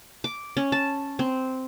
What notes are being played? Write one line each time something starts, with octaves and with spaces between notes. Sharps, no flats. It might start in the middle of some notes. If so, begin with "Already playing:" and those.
D6
C#4
A5
C4